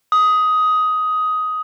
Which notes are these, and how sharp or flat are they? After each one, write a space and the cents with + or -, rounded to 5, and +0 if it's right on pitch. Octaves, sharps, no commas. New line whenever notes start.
D#6 +10